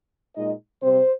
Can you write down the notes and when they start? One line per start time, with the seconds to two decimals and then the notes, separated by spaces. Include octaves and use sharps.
0.35 A#2 G#3 D#4 D#5
0.83 C3 G3 C4 C5